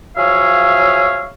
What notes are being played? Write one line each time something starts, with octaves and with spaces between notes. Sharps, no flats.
F3 F#3 G#4 C#5 E5 F5